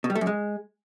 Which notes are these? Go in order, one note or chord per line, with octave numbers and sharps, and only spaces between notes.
B2
G3
A3
F#2
G#3